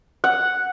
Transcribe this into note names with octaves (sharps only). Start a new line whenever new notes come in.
F#5